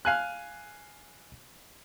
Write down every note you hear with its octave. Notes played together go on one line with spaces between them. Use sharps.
F5 G#5 F#6